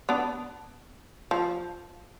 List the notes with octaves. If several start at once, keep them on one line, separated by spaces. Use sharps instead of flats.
B3 D4
F3